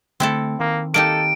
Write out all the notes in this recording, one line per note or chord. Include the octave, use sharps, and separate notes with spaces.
D3 A3 C4 E4 A4
D#3 A#3
A#3 D#4 G4 A4 D7